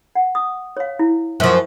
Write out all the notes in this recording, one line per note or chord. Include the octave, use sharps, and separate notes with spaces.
F#5
D#6
C#5 F5
E4
F#2 F3